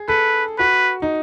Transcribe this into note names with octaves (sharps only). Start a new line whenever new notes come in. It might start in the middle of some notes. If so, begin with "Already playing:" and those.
Already playing: G#4
A4 B4
F#4 B4
D#4